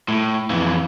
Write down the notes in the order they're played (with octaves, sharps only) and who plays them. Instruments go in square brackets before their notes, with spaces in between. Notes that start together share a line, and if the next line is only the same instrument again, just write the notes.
[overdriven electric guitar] A2
F2 E3